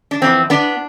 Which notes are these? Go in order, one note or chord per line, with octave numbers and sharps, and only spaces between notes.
D4
F2 E3 B3 C4
B3 D4